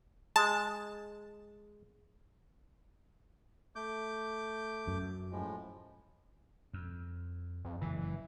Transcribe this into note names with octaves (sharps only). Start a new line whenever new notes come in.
G#3 A5
A3 D6 G6
F#2
A2 F3 G#3
F2
F2
F#1 A#2 E3